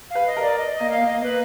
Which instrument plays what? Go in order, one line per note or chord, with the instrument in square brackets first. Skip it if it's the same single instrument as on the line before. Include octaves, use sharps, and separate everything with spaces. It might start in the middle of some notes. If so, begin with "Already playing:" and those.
[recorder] F5
[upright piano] B4
[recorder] D#5
[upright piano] A#4 [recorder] D5
[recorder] D#5
D#5
[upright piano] A#3
[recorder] F5
[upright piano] A#3
[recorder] D#5
[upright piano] A#3 [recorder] B4